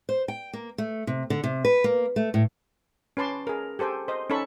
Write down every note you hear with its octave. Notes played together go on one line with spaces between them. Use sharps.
C5
G5
A#3
A3
C3
D3
C3
B4
A#3
A3
A2
C#4 B4 A5 C6 D6
G#4 A#4
G4 A4 C5 G5 G#5
C5 D#5
C#4 D#4 A4 B5 C#6